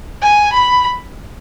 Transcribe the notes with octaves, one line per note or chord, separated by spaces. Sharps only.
G#5
B5